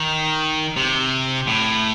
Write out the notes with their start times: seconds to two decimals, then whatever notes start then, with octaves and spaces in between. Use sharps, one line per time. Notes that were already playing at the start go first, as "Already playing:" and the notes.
Already playing: D#3
0.77 C3
1.47 A2